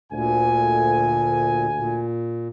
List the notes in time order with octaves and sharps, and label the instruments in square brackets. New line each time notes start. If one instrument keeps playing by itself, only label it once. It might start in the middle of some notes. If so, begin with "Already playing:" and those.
[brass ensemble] D2 G#5 [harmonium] A#2
[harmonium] A#2